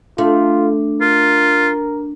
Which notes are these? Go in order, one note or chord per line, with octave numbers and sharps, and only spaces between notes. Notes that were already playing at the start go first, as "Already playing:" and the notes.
A3 D4 F4
F4 A#4